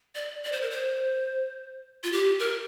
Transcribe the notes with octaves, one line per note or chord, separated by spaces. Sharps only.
D5
D5
C5
A#4
C5
F4
G4
A#4